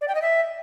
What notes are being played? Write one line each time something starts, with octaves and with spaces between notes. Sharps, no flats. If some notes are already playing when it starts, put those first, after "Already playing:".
D5
G5
D#5
E5